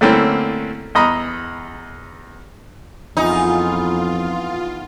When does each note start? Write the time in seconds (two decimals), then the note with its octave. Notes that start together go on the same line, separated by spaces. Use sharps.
0.01 D3 A3 A#3 C4 C#4 E4
0.95 E2 D#5 A#5 B5
3.17 F2 E3 B3 D#4 F4 G#4